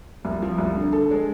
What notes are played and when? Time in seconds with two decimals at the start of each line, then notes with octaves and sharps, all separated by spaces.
0.25 C2
0.42 F3
0.58 C2
0.76 D3
0.93 A4
1.11 G#3